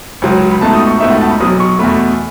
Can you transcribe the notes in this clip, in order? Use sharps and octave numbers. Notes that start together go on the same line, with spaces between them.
C#2 C#3 F#3
B5
C#2 B2 A3 D#4 A5
D#6
C#6
C#2 B2 A3 D#4 E5
F#5
A5
B5
B1 B2 F#3 D#6
C#6
E2 B2 A3 B5